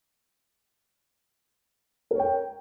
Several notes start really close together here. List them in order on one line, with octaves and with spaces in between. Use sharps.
A#4 C#5 G5